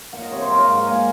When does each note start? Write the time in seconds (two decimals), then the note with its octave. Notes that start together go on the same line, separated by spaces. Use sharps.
0.13 A#3 F#5
0.22 D#5
0.31 C3 C#5
0.41 C5
0.50 F#3 A#4
0.64 G#2 F5
0.76 F#5
0.87 A#3 G#5